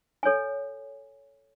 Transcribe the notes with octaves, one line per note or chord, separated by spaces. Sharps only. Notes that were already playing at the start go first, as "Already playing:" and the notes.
A4 C#5 G#5